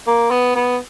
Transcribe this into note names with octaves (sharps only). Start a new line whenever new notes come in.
A#3
B3
B3